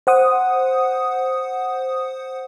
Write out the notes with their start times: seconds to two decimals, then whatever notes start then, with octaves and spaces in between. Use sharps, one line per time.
0.07 C5 F#5 D#6